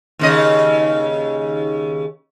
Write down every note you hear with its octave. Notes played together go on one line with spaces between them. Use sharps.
D#2 C#3 D#5